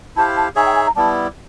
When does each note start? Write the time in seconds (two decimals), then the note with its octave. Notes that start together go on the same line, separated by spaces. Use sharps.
0.16 E4 G4 C5 F5 A5
0.37 A5
0.56 D#4 G#4 C#5 E5 G#5
0.66 G5
0.76 G#5
0.86 A#5
0.96 G3 B3 E4 A5